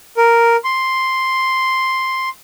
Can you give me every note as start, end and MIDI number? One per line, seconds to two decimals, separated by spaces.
0.17 0.56 70
0.64 2.29 84